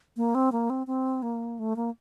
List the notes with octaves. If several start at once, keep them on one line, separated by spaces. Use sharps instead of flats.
A#3
C4
A#3
C4
C4
A#3
A3
A#3